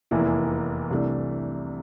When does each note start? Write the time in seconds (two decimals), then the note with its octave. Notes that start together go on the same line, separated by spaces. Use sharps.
0.11 F1 E2 E3 A#3 E4
0.90 C2 C3 E3 A3 D4